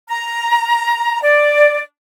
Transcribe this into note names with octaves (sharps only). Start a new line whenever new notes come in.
A#5
D5